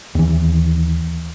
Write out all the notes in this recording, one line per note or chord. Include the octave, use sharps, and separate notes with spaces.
D#2 E3